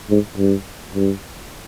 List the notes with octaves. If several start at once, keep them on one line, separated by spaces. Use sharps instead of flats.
G#2
G2
G2